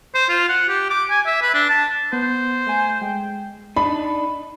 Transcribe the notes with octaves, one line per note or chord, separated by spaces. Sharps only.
C5
F4
F#5
G4
D6
G#5
E5
B4
D4
A5
B3 C5
A3 G#5
G#3 G5
D4 D#4 B5